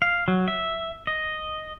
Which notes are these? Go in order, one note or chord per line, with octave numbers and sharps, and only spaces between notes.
F5
F#3
E5
D#5